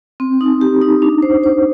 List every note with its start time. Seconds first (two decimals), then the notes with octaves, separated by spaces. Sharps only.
0.20 C4
0.41 D#4
0.61 G4
0.82 D#4
1.02 D4
1.23 C5
1.44 C5